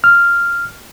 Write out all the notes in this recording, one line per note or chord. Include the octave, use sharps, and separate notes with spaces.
F6